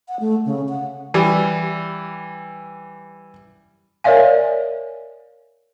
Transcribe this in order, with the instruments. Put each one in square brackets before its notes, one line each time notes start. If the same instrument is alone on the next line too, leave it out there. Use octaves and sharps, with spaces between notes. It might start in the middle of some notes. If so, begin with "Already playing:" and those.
[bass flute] F#5
A3
C#3
F#5
[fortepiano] E3 G3
[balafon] A#4 C#5 D5 E5 F5 G#5